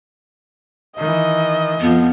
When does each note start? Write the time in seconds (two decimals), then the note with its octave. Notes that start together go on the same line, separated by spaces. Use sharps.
0.97 D#3 E3 D#5
1.81 F2 F3 B3